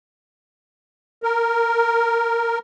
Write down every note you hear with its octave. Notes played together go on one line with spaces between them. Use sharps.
A#4